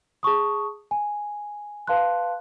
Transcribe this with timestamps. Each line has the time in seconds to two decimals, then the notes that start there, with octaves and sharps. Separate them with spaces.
0.23 G#4 A5 C#6 D#6
0.91 G#5
1.87 B4 F5 A5 C6 F#6